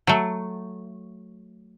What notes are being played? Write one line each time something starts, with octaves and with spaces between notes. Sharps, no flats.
F#3 A3